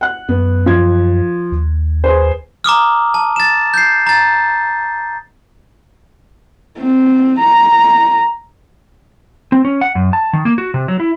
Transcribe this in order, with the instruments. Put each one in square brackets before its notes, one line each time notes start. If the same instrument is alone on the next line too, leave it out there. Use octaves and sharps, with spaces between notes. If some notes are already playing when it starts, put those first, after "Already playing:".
[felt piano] F#5 F#6
[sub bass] F#2 [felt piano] B3
[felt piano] F3 G#6
[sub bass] D#2
[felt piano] G#4 B4 C5
[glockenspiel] A#5 D6 D#6 F6
A5
A6 E7
G6 C7
A#5 A6
[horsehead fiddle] C4
A#5
[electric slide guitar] C4
C#4
F#5
F#2
A5
D#3
A#3
F#4
C3
F#3
E4